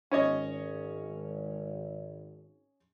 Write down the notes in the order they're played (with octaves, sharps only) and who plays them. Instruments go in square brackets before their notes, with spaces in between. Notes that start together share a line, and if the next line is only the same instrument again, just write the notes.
[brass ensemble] G#1 [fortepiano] C#4 C#5 D#5